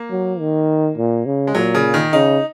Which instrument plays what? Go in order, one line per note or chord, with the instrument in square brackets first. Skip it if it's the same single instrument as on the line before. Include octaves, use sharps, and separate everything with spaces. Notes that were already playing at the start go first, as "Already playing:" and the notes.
Already playing: [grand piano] A#3
[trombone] F#3
D#3
A#2
C#3
[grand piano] G#3
[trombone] A#2 [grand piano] F#3
[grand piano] C#3
D#3
[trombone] C#3 [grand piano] D#4